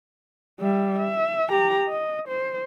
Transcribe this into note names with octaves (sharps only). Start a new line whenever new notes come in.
G3 E5
E5
G4 A#5
D#5
C5